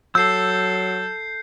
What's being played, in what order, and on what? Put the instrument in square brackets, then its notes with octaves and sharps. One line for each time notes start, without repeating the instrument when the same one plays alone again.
[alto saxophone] F#3 [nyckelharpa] A4 [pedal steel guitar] E6 [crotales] G6 C7